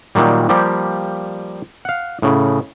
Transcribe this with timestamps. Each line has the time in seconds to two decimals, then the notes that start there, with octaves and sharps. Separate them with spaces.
0.15 A#2 D#3 F#3 G3
0.49 F3 G3 A#3 G4
1.85 F5 F#5
2.22 A2 C#3